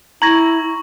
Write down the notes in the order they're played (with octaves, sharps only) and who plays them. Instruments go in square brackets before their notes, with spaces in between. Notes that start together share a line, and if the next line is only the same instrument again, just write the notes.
[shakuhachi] E4 [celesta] A#5 G#6 A#6 [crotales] C#6 F#7